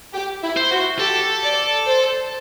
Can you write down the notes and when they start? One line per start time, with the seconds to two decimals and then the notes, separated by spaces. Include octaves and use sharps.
0.13 G4
0.43 E4
0.57 C5
0.72 F#4
1.00 G4 A4
1.43 D5
1.87 C5